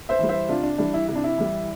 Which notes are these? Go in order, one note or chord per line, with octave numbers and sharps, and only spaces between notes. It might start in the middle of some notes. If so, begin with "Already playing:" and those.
C5 E5
E3 G3
C5 E5
C3 D4 F4
D4
E3 G3 D4
E4
C3 E4
D4
E4
E3 G3